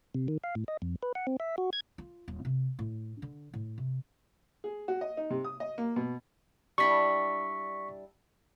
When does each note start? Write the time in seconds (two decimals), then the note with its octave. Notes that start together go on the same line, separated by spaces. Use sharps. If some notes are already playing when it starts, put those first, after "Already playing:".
0.15 C3
0.28 D#3
0.44 F5
0.55 A2
0.68 D#5
0.82 F2
1.03 B4
1.15 F#5
1.27 C4
1.40 E5
1.58 F#4
1.73 G#6
1.98 F4
2.28 D#1
2.45 C3
2.79 A2
3.22 D3
3.54 A2
3.78 C3
4.64 G#4
4.88 F#4
5.01 D#5
5.17 D#4
5.30 C3
5.44 D#6
5.60 D#5
5.78 A#3
5.96 B2
6.78 G3 D4 E4 C#6 B6